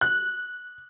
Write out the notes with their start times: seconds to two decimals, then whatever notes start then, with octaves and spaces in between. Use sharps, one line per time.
0.01 F#6